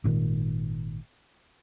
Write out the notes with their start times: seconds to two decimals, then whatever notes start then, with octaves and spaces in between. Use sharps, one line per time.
0.04 G#1 A#2 D#3